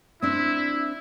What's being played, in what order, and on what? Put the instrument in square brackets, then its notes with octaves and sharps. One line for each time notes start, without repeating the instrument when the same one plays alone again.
[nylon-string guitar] C4 D4 [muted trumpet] E4 [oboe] E6